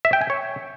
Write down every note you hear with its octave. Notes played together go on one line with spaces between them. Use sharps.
E5
G5
G#5
C#5